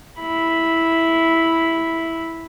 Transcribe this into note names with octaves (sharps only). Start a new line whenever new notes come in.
E4 B5